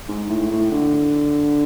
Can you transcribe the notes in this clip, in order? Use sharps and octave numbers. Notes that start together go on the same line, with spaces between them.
G#2
A2
A2
D3